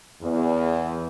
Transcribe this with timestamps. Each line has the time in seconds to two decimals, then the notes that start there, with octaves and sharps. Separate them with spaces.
0.22 E2